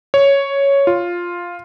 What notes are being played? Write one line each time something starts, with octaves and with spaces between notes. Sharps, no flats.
C#5
F4